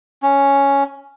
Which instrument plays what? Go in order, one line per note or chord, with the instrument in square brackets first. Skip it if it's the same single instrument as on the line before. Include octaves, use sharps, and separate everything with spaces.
[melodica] C#4